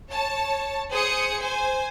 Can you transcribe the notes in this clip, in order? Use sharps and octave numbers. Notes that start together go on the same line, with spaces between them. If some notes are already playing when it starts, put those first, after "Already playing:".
C#5 A5
G#4 C5 D#6 C#7
C5 G#5